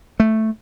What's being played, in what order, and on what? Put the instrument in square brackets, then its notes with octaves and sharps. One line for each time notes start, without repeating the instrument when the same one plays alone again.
[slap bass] A3